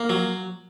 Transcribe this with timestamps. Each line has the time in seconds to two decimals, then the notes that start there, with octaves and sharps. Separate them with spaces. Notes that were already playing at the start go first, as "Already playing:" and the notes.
Already playing: A#3
0.10 F#3